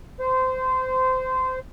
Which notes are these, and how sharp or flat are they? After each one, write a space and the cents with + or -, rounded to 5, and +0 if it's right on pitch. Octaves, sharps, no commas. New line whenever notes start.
C5 -20